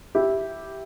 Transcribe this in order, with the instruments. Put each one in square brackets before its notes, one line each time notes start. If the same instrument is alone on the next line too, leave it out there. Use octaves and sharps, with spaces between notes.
[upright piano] E4 G4